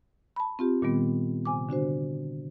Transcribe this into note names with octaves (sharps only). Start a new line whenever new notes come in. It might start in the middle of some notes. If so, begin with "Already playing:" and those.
A5 B5
C4 F4 G4
A#2 D#3 G3 B3
C3 G#5 D6
D3 D4 F#4 C5